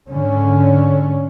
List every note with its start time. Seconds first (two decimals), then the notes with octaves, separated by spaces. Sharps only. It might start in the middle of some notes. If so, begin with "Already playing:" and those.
0.11 G#2 D3 C#4